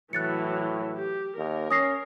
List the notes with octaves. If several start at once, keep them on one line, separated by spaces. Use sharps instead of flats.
A2 E3 F#3 F#6 A6 C#7
G4
D#2 A#4
C#4 D#6 A#6 C7